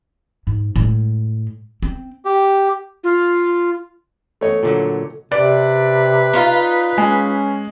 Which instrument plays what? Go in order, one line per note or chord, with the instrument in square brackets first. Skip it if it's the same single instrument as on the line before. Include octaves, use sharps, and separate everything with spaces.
[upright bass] G#2
A2 G#3
C4
[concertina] G4
[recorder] F4
[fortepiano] A3 C#5 D#5
[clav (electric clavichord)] A#2 D3 F#3
[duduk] C3 [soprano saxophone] B4 [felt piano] D5
[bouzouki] D#4 F4
[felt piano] G#3 [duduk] C#4